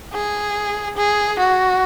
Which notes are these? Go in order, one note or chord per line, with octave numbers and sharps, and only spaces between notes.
G#4
G#4
F#4